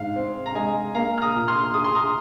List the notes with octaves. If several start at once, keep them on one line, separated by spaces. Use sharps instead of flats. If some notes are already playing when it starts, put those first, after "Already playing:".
Already playing: G#2 F5
C4
A#5
G#3 D#5 G#5
A#3 F5 A#5
F6
A#5 D#6
A#2
C6 F6
G#4 D#6
C6
A#5 D#6